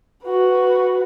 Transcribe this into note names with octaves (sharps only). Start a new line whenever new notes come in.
F#4 B4